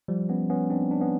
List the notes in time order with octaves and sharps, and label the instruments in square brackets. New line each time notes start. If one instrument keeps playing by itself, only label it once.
[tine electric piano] F3 G3
B3 C#4
B3 C#4
C4 D4
D4
B3 C#4